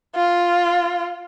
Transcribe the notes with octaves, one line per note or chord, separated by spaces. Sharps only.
F4